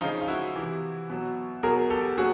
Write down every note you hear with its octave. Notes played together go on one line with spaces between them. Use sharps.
C#3 F3 D#4 F4
F4
E4 F#4
C3 E3
B2 F#3
B2 F#3 G#4 A#4
G4 A4
A#2 F#3 F#4 G#4